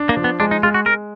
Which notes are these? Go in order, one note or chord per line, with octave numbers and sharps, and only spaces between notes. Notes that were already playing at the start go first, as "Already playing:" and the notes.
Already playing: D4
A#3
F3
B3
G#3 D4
D#4
G#3 F4
F#4
G#3 A#4